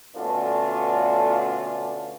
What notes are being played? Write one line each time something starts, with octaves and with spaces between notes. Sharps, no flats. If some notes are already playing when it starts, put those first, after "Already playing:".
B2 D3 A3 C#4 D4 F4